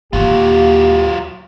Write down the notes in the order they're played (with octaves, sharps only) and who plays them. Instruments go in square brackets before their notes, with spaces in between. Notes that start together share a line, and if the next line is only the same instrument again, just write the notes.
[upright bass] D#2 A#2 [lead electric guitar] F#3 F4 [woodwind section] A#3 [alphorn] G4